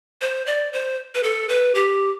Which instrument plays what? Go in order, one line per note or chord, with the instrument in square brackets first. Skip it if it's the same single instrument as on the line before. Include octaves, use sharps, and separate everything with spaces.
[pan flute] C5
D5
C5
B4
A4
B4
G4